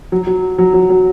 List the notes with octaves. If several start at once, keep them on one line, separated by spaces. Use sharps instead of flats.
F#3
F#3
F#3
F#3
F#3